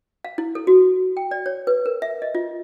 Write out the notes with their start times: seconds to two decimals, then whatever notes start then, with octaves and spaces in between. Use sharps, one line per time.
0.24 F5
0.38 E4
0.55 A4
0.67 F#4
1.17 G5
1.31 D5
1.46 C#5
1.67 B4
1.86 A#4
2.02 E5
2.22 D#5
2.35 F4